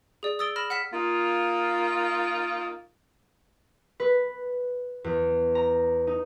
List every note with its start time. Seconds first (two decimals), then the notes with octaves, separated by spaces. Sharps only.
0.23 G#4 D5
0.39 D#6 E6 A6 D7 G7
0.56 B5 F6 A#6 E7
0.70 F#5 F6 B6 E7
0.93 A#3 D#4 F4
4.00 B4
5.04 E2
5.55 A#5
6.07 D#4